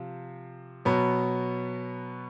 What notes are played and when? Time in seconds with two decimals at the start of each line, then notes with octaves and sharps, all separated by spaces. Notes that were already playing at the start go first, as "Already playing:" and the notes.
Already playing: C3 F3
0.85 B2 F#3 B3